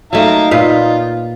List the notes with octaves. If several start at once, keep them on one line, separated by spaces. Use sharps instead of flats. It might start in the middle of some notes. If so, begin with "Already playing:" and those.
F#3 A3 D#4 F5 A#5
A#2 F4 B4 F5